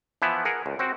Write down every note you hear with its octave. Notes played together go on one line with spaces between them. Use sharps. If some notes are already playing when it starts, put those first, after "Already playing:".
E3 F3 B3 E4
G#4 A#4 F#5
C#2
C4 F#4